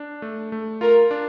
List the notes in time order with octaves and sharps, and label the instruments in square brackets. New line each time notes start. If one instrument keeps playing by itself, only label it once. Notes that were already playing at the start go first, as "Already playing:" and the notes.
Already playing: [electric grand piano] D4
A3
A3
[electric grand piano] F4 [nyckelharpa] A#4
[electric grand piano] D4